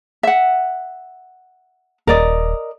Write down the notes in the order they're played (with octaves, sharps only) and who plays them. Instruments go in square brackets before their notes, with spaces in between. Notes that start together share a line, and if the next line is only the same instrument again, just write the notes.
[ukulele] E5 F#5
[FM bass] D#1 [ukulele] A#4 D5 D#5